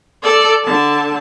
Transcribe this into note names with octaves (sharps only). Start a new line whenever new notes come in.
A4 D5
D3 A5